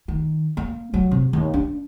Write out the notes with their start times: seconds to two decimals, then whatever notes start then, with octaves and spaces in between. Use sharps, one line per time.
0.08 D#3
0.57 A#3
0.94 F#3
1.11 C3
1.33 D#2
1.54 D4